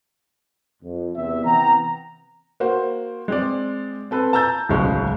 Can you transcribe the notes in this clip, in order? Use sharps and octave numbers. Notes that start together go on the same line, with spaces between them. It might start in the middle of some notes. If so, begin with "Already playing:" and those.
F2
E2 C3 E5
C3 E3 B3 G5 A#5
A#3 F#4 C5
G#3 C4 D5
C4 A4 B4
A5 A#5 E6 G6 A6
D1 B1 F#2 C#3 G#3 C#6